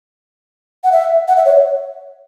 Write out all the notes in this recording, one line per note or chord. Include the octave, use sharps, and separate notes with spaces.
F#5
E5
F#5
E5
C#5